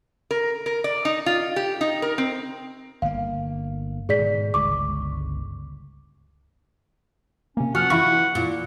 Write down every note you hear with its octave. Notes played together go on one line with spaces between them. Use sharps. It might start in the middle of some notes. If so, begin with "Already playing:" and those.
A#4
A#4
D5
D#4
F4
G4
D#4
A#4
C4
G1 A#3 F5
G#2 B2 D#3 G#4 D5 B6
G1 C#2 G#3 C#6 D6
C3 A#3 C#4
F3 F#4 F#5 F6
E3 E4 F4 C#6
A#2